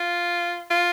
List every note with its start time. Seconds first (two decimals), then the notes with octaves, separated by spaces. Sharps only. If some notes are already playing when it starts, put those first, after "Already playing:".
Already playing: F4
0.70 F4